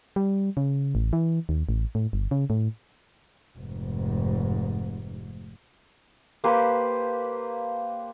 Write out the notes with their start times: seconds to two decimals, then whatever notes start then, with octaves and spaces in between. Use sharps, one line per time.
0.16 G3
0.57 C#3
0.95 A1
1.13 E3
1.49 D#2
1.69 A1
1.95 A2
2.13 G1
2.31 C#3
2.50 A2
3.58 F1 G#2
6.44 A#3 G4 B4 C5